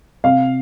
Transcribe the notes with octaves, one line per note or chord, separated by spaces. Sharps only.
C3 F5